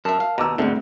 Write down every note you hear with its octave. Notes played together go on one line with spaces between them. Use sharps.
F#2 A#4 E5 A5
F5
D#2 B2 A#5 D6 E6
D2 G#2 D3 A3 C4